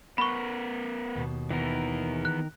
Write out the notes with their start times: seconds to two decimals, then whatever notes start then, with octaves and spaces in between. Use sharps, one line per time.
0.18 B3 A#4 B4 B5 C#6
1.16 D#2 B2
1.50 D#3 E3 B3 A#4
2.25 F#6